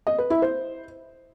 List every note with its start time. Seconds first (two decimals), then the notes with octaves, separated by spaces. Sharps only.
0.07 D#5
0.18 B4
0.30 E4
0.42 C5